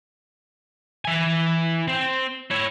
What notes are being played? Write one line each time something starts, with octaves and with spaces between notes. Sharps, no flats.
E3 G#5
C4
E4 C#5